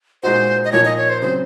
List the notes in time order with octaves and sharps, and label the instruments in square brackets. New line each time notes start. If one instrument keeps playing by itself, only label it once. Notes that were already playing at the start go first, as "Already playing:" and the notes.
[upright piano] A#2 G#3 D#4 F#4 [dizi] C5
[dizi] D#5
[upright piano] A#2 F3 A#3 D#4 [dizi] C#5
[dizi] D#5
C#5
C5
[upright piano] C#3 F#3 C4 [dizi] C5